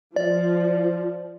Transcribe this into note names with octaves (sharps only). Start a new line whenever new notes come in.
F3 D5